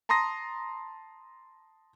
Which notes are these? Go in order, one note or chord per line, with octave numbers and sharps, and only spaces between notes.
A5 A#5 C6 D#6 A#6